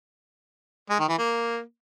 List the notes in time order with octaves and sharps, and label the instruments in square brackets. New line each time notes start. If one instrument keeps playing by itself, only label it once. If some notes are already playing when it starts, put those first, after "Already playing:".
[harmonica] G#3
D#3
E3
A#3